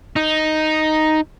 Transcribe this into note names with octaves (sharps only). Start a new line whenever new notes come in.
D#4